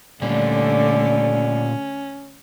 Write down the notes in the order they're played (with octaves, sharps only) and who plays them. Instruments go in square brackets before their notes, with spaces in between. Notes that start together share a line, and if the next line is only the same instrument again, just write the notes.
[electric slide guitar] A#2 G3 [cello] D3 A3 [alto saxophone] C#4 [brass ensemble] D5